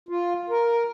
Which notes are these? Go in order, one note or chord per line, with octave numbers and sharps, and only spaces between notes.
F4
A#4